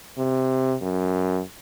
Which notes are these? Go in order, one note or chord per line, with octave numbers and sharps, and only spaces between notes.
C3
F#2